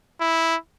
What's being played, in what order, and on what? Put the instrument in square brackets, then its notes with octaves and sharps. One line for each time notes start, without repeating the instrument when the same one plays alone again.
[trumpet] E4